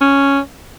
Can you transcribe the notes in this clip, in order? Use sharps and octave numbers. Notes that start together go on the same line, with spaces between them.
C#4